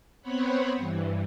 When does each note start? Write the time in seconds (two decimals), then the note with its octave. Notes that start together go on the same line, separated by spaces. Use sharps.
0.22 B3 C4 C5 C#5 F#5 B5
0.76 G2 E3